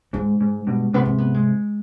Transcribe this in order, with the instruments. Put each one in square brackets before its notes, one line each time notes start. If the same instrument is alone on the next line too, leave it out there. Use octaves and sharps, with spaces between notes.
[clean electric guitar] G#2 [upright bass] G#3
[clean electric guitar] G#2
G2 B2
[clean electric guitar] G#2 C3 [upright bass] B3
[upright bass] C4
B3
G#3